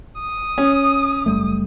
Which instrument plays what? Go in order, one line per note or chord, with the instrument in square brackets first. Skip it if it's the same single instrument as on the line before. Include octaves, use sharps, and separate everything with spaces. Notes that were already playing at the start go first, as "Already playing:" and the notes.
[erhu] D#6
[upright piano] C#4
[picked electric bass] F#1 G3 A3